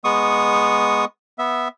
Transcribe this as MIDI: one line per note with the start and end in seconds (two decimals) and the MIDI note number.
0.04 1.05 56
0.04 1.05 59
0.04 1.05 85
0.04 1.05 87
1.38 1.68 59
1.38 1.68 76